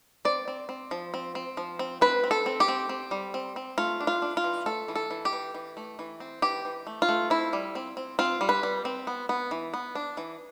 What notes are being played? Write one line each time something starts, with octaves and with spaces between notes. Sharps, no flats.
C4 D5
C4
C4
F3
C4
C4
F3
C4
C4 B4
C4
A4
C4
G4
C4
C4
G3
C4
C4
A3 F4
D4
F4
D4
F4
E3
A3 A4
E3
A4
E3
G4
E3
E3
A3
E3
C4
E3 G4
E3
A3
F4
A3
C4 E4
G3
C4
C4
C4 F4
G3
B4
G3
C4
B3
B3
E3
B3
D4
E3